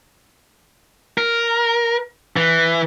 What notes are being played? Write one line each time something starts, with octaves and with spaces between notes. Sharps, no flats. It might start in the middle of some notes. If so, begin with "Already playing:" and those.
A#4
E3